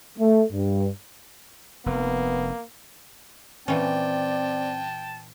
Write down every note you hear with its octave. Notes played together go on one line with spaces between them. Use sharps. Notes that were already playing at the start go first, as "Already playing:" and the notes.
A3
G2
F1 A#3 B3
A#2 E3 C4 C#4 D5 G5 A5